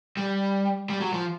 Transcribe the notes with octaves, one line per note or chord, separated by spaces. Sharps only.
G3
G3
F#3
F3